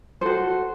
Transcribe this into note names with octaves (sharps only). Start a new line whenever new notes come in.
F#4 A4 C5